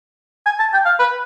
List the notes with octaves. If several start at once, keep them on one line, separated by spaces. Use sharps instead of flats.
G#5
A5
G5
F5
B4